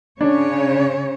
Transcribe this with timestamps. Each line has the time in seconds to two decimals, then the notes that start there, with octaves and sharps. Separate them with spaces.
0.21 C#3 D4 C#5